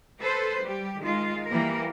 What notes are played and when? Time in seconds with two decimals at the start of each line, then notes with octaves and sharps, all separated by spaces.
0.19 A4 B4 C5
0.62 G3 G4
1.01 D#3 G#3 F4
1.47 E3 G3 A#3 A#4